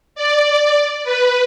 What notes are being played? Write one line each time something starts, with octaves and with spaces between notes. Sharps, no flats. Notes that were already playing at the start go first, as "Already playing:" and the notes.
D5
B4